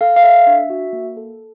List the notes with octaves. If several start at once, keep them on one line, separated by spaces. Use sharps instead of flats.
A4 F5
F5
A4 E5
D4
F#4
A#3
A4